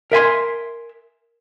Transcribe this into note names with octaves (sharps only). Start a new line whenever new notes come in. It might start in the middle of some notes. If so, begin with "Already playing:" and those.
A#4 E5 G#5 C6